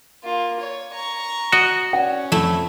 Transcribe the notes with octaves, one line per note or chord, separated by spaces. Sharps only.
A#3 F4
C#5
A#5 C#6
F#4 D#5
C#4 D5 F#5
F2 A3 E4